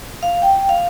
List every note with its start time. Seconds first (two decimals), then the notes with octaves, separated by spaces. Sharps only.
0.23 F5
0.42 G5
0.69 F5